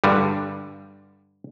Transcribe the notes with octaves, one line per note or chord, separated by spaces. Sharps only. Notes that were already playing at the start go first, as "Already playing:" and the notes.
G2 D3 G3